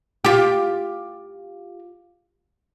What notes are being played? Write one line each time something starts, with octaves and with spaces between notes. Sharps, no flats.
F4 G4